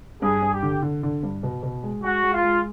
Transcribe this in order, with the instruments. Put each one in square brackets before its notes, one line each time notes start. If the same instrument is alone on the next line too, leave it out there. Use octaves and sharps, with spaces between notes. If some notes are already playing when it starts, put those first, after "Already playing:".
[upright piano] G2 [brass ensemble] G#4
[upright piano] G2
[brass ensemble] G4
[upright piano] D3
D3
D3
G2
B2
B2
G#3
[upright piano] G#3 [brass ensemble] F#4
[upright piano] G#3
[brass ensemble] F4
[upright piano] G#3